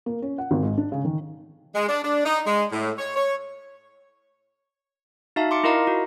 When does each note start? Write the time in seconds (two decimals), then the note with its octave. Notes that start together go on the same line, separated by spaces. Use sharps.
0.06 A#3
0.22 C#4
0.38 F#5
0.51 G#1
0.63 G#2
0.78 D4
0.92 C#3
1.05 D#3
1.75 G#3
1.89 D4
2.04 D4
2.26 D#4
2.47 G#3
2.73 A2
2.99 C#5
3.16 C#5
5.36 D#4 F#4 E5 F5 A5
5.51 C6 D6 C#7
5.64 E4 F4 A#4 D#5 F5 A#5
5.87 F#4